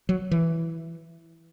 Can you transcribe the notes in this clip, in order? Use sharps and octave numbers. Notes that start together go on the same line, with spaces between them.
F#3
E3